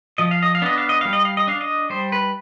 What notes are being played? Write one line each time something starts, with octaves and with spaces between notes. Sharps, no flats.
F3 D#5
F5
D#5
F5
B3 D4 D#5
F5
D#5
G3 F5
D#5
F5
D#5
D4 F5
D#5
G3 C5
B4